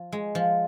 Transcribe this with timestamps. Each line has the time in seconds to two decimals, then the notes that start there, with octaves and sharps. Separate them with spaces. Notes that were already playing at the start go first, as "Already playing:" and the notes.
Already playing: F3
0.12 G#3
0.35 F3